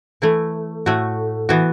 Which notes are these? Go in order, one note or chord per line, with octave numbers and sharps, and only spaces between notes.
E3 A3 E4
A2 A3 F#4
E3 B3 F#4